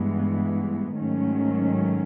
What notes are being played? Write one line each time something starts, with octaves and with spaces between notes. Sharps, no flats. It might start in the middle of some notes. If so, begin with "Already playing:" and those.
Already playing: G2 E3 G#3 B3
G#2 D#3 F#3 A3 C#4